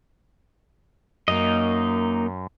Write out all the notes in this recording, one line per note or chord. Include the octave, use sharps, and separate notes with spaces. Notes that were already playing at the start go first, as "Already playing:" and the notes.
F#2 A#3 D#4 D#5